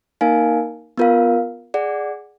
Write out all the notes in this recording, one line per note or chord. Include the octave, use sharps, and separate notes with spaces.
A#3 D#4 A#4 F5 G#5
B3 F4 A#4 F5
G#4 D5 F#5